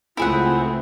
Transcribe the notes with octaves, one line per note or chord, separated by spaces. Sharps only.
C#2 A3 C4 E4 F4 G#4 F#5